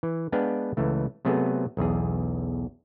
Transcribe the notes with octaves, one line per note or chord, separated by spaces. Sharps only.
E3
G#3 B3 D4 B4 F5 G5
C#2 E3 A3
C3 F#3 A3 B3 G#4
B1 E2 G#4